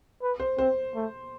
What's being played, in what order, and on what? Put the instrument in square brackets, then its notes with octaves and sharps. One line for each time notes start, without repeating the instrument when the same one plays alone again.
[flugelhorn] B4
[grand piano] C5
[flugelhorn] C4 [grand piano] C5
[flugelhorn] A3